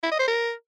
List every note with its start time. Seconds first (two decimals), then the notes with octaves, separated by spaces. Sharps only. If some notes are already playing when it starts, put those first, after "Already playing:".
0.03 E4
0.11 D#5
0.20 C5
0.28 A#4